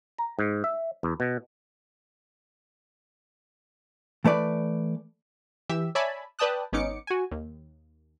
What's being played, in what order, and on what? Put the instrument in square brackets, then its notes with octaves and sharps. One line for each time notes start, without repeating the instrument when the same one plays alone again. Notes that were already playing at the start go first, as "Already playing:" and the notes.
[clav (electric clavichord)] A#5
G#2
E5
E2
B2
[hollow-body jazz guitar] E3 A3 B4 D5
[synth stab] E3 G4 E5
C#5 D5 E5 G#5 A5 B5
B4 D5 G5 A5 D#6 F#6
G#1 B3 C#4 D#4 D6 C#7
F#4 G#5
D#2